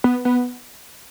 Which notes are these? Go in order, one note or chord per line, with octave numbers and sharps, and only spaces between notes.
B3
B3